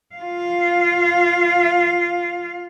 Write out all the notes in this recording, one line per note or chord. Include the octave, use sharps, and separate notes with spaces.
F4 F5